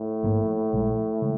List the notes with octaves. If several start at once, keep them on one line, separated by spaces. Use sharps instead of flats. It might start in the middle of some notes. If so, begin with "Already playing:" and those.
Already playing: A2
A1 G#2 F3 A#3
A#1 A#2 F3 G#3
C#3 E3 G#3